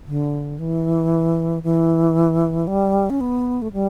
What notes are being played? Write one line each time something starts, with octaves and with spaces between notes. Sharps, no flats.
D3
E3
E3
G3
C#4
B3
A3
G3